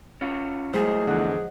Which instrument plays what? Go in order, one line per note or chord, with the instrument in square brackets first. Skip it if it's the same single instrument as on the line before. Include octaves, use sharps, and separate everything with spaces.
[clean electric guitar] C#4 F4 F#4
[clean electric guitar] A2 A#3 [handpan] F#3 G#3 [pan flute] G#4 [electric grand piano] C5 G#5
[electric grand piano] E2 D3 [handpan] F3 D#5 F#5